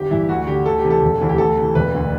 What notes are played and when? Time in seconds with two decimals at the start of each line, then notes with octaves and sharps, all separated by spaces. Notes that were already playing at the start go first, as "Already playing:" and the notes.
Already playing: G1 G4
0.11 G2 E3 E4
0.29 D2 F#4
0.42 F#4
0.47 D3 G4
0.65 D2 A4
0.78 G4
0.84 C3 E3
0.90 A4
1.02 E1
1.21 D2 C3 E3
1.29 G4
1.38 D2 A4
1.57 C3 E3
1.75 E1 B4
1.93 D2 D3